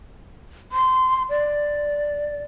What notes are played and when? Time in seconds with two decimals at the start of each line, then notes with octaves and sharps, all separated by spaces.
0.72 C6
1.30 D5